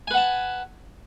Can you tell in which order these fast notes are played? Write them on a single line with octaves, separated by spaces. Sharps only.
G#5 B4 F#5 A5